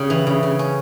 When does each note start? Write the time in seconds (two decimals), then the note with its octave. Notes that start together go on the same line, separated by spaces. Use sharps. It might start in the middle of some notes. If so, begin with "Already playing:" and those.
Already playing: C#3 G4
0.10 E3
0.27 C#3
0.43 C#3
0.59 C#4